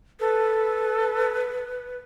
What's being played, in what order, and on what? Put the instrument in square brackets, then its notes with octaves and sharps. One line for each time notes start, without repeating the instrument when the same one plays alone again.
[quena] A4 [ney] B4